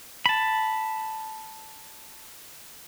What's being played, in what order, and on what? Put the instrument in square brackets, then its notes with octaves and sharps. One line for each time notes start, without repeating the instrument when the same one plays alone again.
[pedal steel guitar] A5 B5